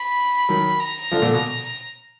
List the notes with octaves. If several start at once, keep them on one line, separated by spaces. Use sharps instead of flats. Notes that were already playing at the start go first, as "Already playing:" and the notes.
Already playing: B5
D#3 F#3
A#5
D3 F3
A#2 D3
B2